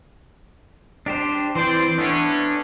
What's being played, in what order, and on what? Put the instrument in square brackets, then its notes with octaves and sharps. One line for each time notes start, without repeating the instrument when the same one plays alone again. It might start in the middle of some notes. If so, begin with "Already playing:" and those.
[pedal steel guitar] D4 G4 C5
[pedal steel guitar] E3 C4 [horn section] C5 D5
[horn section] A3 B3 C#4 [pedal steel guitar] D4